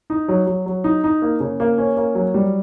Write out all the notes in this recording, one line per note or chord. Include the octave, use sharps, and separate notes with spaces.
D#4
F#3
F#3
F#3
D#4
D#4
A#3
C#3
A#3
C#4
A#3
F#3
G3